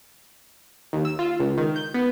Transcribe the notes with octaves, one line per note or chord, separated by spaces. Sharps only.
D#2
E6
F4
C#2
D#3
G6
B3